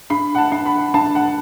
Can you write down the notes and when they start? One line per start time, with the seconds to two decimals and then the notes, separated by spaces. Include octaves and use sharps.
0.10 D4 B5
0.35 F#5
0.38 A5
0.52 D4
0.66 B5
0.94 D4 A5
1.15 F#5